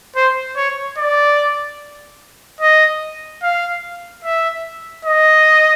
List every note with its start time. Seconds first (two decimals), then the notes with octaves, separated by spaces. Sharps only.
0.16 C5
0.56 C#5
0.98 D5
2.61 D#5
3.42 F5
4.24 E5
5.05 D#5